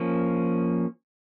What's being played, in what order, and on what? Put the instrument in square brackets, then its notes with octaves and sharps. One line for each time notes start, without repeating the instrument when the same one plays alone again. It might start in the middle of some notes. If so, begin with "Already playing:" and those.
Already playing: [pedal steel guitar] F3 A#3 C#4